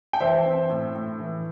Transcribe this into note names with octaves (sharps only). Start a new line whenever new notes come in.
G5
E3 C5 E5
C4
A2
A2
E3